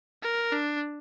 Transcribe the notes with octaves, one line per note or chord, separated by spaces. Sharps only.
A#4
D4